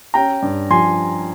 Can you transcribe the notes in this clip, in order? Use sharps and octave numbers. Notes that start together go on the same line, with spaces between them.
C#4 G5 A#5
G2
F3 G#5 C6